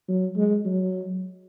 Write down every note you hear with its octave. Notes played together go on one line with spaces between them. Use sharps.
F#3
G#3
F#3